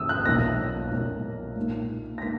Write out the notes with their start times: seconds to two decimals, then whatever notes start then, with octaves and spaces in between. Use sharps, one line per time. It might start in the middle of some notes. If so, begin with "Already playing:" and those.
Already playing: G#1 F#2 C#3 E3 A#3 D#6 E6
0.09 F#6
0.25 B1 A#2 A#3 C#4 A#6
0.91 B1 A#2 A#3 C#4
1.56 A#2 A#3 D#4
2.18 A#6
2.21 A#2 A#3 D#4 B6